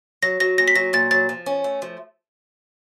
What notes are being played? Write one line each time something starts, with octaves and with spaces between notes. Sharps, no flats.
F#3 A#6
F#3 A#6
A#2 A#6
B6
F#3 A#6
A#2 A6
F#3 A6
F3
C#4
A3
F3